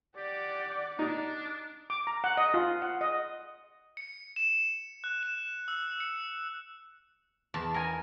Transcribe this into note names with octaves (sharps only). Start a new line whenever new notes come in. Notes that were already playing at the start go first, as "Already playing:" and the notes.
G4 D5 F#5
D4 D#4
D6
A#5
F#5
D#5
F4
F#5
D#5
C#7
E7
F#6
E7
E6
C#7
E2 A5
D#4 A#4 G#5